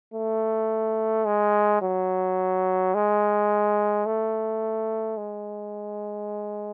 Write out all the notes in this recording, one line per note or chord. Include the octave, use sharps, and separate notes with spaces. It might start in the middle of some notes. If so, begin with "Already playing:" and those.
A3
G#3
F#3
G#3
A3
G#3